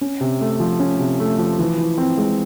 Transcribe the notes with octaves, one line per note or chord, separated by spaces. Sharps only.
C#4
C3
A3
F3
C#4
C3
A3
F3
E3
E3
C4
G#3